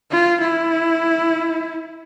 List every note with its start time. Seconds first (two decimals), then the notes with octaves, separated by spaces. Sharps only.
0.11 F4
0.41 E4